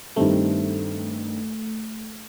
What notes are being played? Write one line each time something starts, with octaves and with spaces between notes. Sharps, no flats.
G2 D#3 G3 A3 C4